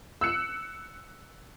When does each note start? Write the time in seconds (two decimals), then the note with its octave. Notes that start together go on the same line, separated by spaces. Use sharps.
0.21 E6 F#6 C#7